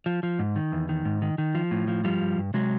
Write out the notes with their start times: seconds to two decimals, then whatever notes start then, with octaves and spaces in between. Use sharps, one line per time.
0.06 F3
0.23 F3
0.39 G#2
0.56 D#3
0.72 E2
0.89 D#3
1.05 G#2
1.22 D#3
1.38 D#3
1.55 F3
1.71 A2
1.88 F3
2.04 G2 F3 G3
2.21 G2
2.38 G2
2.54 C3 F#3 G#3